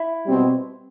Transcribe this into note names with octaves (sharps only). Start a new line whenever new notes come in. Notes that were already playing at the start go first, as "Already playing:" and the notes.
Already playing: E4
B2 G3 C4